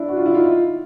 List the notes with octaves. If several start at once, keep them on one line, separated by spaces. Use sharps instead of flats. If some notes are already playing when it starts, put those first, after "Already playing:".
Already playing: D4 E4
F#4
F4
E4
D#4 F4